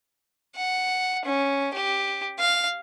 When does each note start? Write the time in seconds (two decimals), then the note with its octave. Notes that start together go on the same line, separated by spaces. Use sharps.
0.56 F#5
1.25 C#4
1.74 G4
2.39 F5